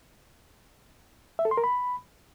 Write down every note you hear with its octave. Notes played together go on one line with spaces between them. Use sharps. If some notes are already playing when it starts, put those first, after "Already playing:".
E5
A4
C6
A#4
B5